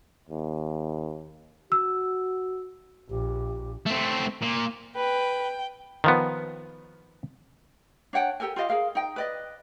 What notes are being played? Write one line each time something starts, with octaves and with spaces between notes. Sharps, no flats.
D#2
F#4 E6
A#1 G4
A3 C4
A#2
B4 G5
D#3 F3 B3
D4 C#5 F#5 G5
G4 A4 A#4 G#5
F4 G4 D#5 F5
G#4 A#4 F5
D#4 G5
B4 D5 D#5